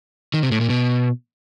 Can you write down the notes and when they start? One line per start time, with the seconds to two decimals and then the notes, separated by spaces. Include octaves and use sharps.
0.34 D#3
0.43 C3
0.52 A2
0.61 A#2
0.70 B2